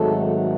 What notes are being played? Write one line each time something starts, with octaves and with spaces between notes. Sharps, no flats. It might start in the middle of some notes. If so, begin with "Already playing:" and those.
Already playing: G#1 G#2 D#3 F#3 A3 A4